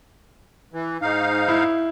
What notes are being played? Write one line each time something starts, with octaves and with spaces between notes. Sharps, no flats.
E3
G#2 D#4 F5
E4